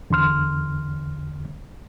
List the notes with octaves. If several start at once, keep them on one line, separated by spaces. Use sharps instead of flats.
E2 D3 C6 F6